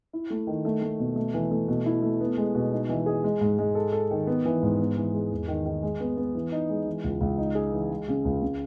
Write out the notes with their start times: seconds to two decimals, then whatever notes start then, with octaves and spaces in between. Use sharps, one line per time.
0.13 E4
0.30 A3
0.47 D#3
0.65 A3
0.82 A3
0.99 B2
1.16 A3
1.34 E3
1.51 A3
1.68 B2
1.86 E4
2.02 A3
2.21 B3
2.37 G#3
2.55 B2
2.72 D#4
2.89 E3
3.06 G#4
3.24 G#3
3.41 G#2
3.58 G#3
3.75 A4
3.92 A4
4.11 D#3
4.27 B3
4.45 E3
4.63 G#2
4.79 B3
4.97 E3
5.14 G#3
5.31 E2
5.48 D#3
5.66 D#3
5.83 G#3
6.00 B3
6.17 B3
6.35 E3
6.52 D#4
6.70 G#3
6.86 E3
7.04 C#2
7.21 C#2
7.38 D#4
7.55 G#4
7.72 E3
7.90 G#3
8.08 C#3
8.25 C#2
8.42 C#3